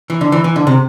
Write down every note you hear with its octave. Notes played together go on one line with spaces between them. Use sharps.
E3
D3
E3
E3
D3
C3